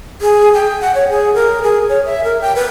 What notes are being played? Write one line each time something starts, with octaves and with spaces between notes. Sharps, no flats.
G#4
G5
F#5
C#5
G#4
A#4
G#4
C#5
E5
A#4
G5
B4